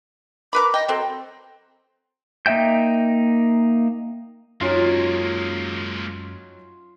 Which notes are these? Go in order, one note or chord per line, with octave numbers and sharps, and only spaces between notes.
A#4 B4 B5 D6
D#5 G5
F#3 C4 A4
A#3 D#4 E5 G5 G6
F#2 F#3 G#3 A#3 C#4 D#4 F4